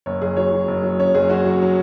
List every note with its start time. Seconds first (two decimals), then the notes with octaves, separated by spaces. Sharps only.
0.06 F#1 C#5
0.22 F#1 G#4
0.37 F#3 C#5
0.53 F#3
0.68 F#1
0.83 F#3
0.99 C#4 C#5
1.15 F#1 G#4
1.30 C#4 F#4
1.46 F#3
1.62 F#3